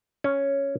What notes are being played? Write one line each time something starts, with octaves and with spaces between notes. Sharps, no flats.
C#4